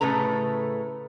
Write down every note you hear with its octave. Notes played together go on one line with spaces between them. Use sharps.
A2 C#3 A3 B4 A#5